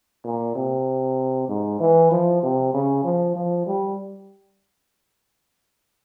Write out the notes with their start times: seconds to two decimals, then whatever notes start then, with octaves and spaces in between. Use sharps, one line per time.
0.25 A#2
0.55 C3
1.48 G#2
1.80 E3
2.11 F3
2.43 C3
2.74 C#3
3.04 F3
3.36 F3
3.66 G3